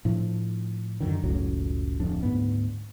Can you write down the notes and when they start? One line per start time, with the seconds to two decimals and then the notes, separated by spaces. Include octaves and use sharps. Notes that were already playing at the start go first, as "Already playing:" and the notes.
0.05 A2 F3 D4
1.00 F#2 D3 D#3
1.23 F#1 C#2 A2 F#3
2.00 D1 F2 D4
2.23 D2 G#2 B3